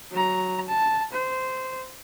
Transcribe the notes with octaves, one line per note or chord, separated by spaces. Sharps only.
F#3 A#5
A5
C5